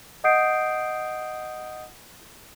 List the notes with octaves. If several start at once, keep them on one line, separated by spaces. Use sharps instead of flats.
D#5 F#5 D#6 G6 C7 D7